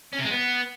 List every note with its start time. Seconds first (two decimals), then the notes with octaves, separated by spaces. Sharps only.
0.13 C#4
0.19 C3
0.25 G#3
0.30 B3